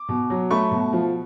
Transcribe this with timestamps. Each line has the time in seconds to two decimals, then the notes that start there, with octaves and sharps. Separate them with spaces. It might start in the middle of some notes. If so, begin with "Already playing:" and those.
Already playing: D6
0.09 B2
0.30 F#3
0.51 A3 B5 C#6
0.71 B2
0.93 F3